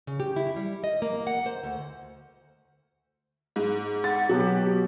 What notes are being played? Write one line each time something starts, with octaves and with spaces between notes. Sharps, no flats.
C#3
G4
E4
G3
D#5
A#3
F#5
C5
D2
G#2
F#5 A6
B2 F#3 F#4 G4